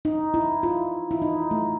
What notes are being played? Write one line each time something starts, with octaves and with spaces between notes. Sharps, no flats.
D#4
E4
F4
E4
D#4
A3